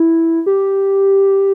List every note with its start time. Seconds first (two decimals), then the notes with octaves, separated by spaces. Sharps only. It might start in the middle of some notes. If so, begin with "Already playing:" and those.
Already playing: E4
0.46 G4